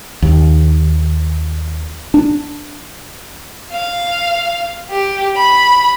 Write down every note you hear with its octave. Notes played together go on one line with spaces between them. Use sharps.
D#2
D4
F5
G4
B5